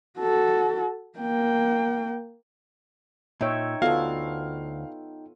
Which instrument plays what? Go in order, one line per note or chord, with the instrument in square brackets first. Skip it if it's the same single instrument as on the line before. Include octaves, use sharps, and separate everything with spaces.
[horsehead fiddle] F#4 A4
A#3 G5
[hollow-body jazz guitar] A#2 [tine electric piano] D#4 G5 [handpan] C#5 E5
[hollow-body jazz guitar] D2 F#4 [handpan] B3 F4 A4 [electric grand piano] F5